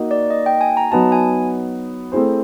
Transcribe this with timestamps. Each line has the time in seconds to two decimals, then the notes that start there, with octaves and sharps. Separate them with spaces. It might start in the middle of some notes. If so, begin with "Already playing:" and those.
Already playing: A#3 D#4 F#4
0.11 D5
0.30 D#5
0.46 G5
0.61 G#5
0.77 A#5
0.92 F#3 B3 D#4 F#4 A5
1.12 G#5
2.12 A3 C4 E4 G#4 C5